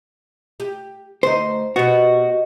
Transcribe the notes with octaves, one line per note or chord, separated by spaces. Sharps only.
G4
D2 D#4 C5
B2 B3 F#4 G4 D#5